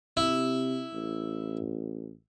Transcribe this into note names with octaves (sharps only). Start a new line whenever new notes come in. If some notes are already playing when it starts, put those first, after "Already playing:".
C3 E4
A1